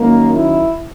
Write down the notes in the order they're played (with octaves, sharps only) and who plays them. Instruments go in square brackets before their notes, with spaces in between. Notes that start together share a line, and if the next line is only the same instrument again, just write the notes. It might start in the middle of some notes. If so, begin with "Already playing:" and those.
Already playing: [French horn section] F#2 D#3 A#3
E4